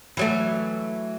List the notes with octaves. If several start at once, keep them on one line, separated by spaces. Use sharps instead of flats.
E3 F#3 A3